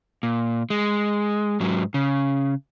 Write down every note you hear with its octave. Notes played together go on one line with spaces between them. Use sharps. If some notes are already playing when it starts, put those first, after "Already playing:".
A#2
G#3
G#2 F#3
C#3